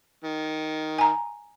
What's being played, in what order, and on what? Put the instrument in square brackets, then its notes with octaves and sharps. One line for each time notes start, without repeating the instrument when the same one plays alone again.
[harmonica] D#3
[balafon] G#5 A#5